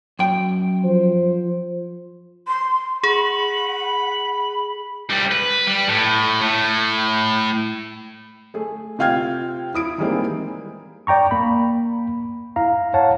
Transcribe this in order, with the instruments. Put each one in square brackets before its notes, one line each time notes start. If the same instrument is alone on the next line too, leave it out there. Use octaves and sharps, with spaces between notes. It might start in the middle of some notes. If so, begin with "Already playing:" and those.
[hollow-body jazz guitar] F#2 G5
[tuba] F3 [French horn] C5
[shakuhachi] C6
[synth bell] G#4 [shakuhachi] F#5 [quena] B5
[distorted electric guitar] C2 G3
B4
G3
A2
A2
[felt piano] A3 G#4
C3 F4 F5 G5 F6 G#6
E4 D#6 D7
D#3 E3 G3 G#3 A#3 C4
[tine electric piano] D5 G5 A#5 C#6
A#3 B5
E4 F5 A#5
C#5 F5 F#5 A5